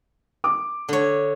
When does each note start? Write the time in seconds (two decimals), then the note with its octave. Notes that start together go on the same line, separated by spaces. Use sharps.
0.44 D6
0.89 D3 C#5